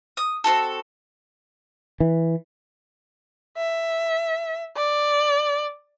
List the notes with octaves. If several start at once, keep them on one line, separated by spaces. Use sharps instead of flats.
D#6
C4 C#4 F#4 A4
E3
E5
D5